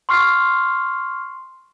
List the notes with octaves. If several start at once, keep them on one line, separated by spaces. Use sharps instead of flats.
C6 C#6 F6 C7